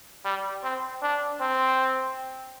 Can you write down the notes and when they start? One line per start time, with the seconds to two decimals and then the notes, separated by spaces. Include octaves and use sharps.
0.25 G3
0.63 C4
1.02 D4
1.41 C4